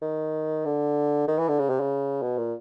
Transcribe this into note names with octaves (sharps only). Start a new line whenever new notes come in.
D#3
D3
D#3
E3
D3
C#3
C3
C#3
B2
A#2